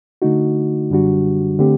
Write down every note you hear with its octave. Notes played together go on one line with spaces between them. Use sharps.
D3 A3 D#4 F#4
F#2 D3 G3 D4 F#4
D3 A3 C4 G4